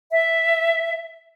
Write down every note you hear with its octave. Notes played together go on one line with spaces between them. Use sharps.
E5